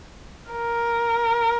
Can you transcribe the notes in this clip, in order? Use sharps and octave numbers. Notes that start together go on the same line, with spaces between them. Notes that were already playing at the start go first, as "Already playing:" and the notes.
A#4